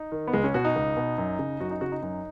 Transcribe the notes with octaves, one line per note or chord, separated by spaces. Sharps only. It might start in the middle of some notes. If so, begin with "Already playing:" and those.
Already playing: D#4
D#3
B3
C#2 G#3
C#4
B2 F#4
D#4
C#2
B2
F#2
C#3
F#2 F#4
D#4
C#3 F#4
D#4
F#2